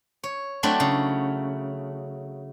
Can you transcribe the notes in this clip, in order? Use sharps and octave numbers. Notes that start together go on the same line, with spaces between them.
C#5
F#3 A3 C4 D4 E4
C#3